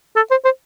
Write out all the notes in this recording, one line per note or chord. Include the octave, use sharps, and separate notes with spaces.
A4
C5
C5